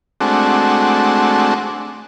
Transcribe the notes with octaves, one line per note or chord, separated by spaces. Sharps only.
G#3 A3 C4 D4 F#4